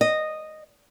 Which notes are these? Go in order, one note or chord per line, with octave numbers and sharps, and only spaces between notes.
D#5